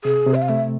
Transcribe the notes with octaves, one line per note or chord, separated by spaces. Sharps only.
C3 G#4
C3
E5
F5
A3 E5